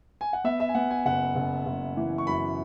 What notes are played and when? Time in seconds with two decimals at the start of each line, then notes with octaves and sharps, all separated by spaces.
0.21 G#5
0.33 F#5
0.44 B3 E5
0.60 E5
0.69 G#5
0.75 B3 F#5
0.90 G#5
1.05 F#1 F#5
1.35 F#1
1.66 F#1
1.97 E3
2.18 C#6
2.27 F#2 B5